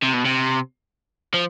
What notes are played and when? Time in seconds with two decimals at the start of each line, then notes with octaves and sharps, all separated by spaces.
0.02 C3
0.13 B2
0.25 C3
1.34 F3